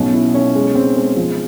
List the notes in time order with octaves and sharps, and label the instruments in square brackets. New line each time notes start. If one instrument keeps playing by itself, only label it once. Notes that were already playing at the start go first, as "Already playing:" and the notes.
Already playing: [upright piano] B1 B2 [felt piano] C#4
[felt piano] E4
C#4
G#3
C4
G#3
F3